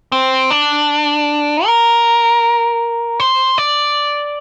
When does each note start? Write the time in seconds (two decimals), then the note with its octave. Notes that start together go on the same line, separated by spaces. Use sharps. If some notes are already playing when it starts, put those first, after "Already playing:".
0.12 C4
0.51 D4
1.66 A#4
3.20 C5
3.58 D5